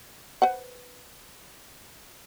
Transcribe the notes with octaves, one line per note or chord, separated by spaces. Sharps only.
B4 C5 F#5